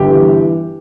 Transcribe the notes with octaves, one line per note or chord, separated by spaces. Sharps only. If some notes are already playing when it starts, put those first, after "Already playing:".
Already playing: G1 G4
E3